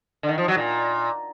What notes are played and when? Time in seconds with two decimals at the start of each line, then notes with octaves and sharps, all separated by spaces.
0.23 D3
0.29 D#3
0.38 F3
0.48 F#3
0.57 A#2